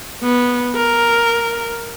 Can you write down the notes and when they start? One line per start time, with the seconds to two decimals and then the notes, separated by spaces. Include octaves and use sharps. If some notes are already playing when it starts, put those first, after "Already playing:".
0.22 B3
0.75 A#4